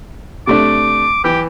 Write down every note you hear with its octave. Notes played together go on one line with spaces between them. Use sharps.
C3 A3 D4 D6
E3 G4